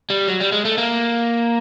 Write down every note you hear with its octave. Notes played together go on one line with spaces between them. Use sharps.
G3
F#3
G3
G#3
A3
A#3